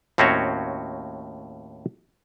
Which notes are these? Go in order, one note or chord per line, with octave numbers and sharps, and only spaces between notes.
D#2 A2 C4 C#4 F#4 C#5